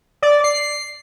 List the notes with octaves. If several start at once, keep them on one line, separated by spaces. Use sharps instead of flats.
D5
C7